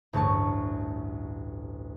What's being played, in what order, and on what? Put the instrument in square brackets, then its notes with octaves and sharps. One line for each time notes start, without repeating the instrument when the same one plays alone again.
[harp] A1 D2 G2 A5 C#6